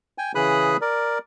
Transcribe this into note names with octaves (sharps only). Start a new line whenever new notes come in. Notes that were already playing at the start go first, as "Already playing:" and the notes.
G5 G#5
C#3 E3 G#4 B5 D#6 F#6
A#4 D5